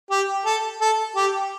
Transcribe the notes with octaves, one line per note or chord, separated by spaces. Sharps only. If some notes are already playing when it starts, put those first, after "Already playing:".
G4
A4
A4
G4